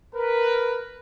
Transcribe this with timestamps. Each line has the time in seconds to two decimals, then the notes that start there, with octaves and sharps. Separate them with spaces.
0.15 A#4 B4